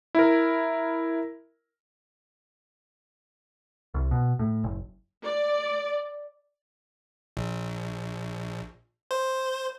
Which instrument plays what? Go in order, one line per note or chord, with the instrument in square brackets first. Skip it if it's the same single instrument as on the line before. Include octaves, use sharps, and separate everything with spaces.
[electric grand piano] E4 A#4
[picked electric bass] C2
B2
A2
F#1
[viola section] D5
[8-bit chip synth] A#1
C5